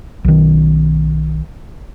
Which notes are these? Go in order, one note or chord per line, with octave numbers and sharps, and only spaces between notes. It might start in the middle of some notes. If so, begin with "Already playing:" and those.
B1 D#3